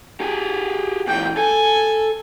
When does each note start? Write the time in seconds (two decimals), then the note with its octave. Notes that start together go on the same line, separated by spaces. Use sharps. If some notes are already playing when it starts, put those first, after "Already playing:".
0.20 G4 G#4
1.07 A#2 E3 G5
1.37 A4 G#5